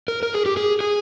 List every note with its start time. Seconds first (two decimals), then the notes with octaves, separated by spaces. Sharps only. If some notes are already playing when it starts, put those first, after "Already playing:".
0.08 A#4
0.23 A#4
0.34 G#4
0.46 G4
0.57 G#4
0.81 G#4